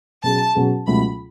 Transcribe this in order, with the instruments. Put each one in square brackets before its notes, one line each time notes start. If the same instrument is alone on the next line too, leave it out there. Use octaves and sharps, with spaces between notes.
[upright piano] B2 F#3 C#4 G#4 [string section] A5
[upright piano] B2 F#3 C#4 G#4
[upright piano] C#2 B2 F#3 A3 [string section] B5